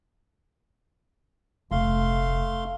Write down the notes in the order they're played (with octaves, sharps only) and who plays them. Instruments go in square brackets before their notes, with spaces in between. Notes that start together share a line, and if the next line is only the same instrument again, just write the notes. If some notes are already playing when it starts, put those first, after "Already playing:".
[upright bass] F1 A#1 [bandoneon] A3 F5 C6